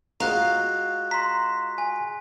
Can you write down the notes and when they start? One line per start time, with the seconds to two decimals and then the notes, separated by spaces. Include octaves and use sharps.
0.20 G#3 F4 F#4 F5 A#5 F#6
1.11 A#5 C6 B6
1.78 G#5